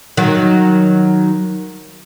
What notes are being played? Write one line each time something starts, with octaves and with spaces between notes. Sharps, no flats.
D#3 F#3